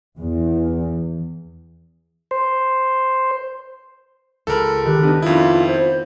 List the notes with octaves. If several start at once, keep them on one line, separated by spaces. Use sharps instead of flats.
E2
C5
C#2 A4 A#4 B5
D#3 G4 F#6
B3 D4 D#4
F2 E4 F4
C5